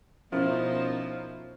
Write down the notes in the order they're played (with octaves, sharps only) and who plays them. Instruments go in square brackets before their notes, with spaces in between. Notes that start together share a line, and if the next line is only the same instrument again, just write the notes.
[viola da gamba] B2 D#4 C5 [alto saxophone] F3 [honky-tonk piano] C#4 E4 A#4